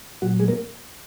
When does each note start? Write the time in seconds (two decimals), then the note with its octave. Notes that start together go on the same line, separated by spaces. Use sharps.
0.22 A#2 F#3 F#4
0.40 G#3 G#4
0.48 A#3 A#4